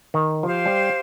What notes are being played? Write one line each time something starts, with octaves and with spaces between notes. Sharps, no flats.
D#3
F3 G4 C5 F5
G3